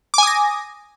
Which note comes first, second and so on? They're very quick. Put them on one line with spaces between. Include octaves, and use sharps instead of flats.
D6 G#5 D#6 A#6